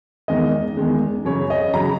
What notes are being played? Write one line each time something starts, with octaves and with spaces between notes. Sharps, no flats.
E2 D#3 G#3 D#5
E2 D#3 G#3
F#2 C#3 F#3 C#5
D#5
C#3 F#3 A#5